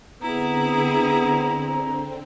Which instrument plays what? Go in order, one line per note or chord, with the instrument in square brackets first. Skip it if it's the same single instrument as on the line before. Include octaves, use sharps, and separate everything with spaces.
[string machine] D3 C4 [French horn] B3 [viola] E4 G#4 [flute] A#5